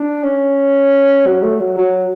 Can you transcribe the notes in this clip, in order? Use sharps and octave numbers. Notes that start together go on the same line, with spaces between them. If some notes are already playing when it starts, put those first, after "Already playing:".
Already playing: D4
C#4
F#3
A3
F#3
F#3